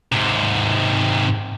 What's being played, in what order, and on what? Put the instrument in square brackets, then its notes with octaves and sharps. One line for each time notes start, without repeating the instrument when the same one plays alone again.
[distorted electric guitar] G#2 C3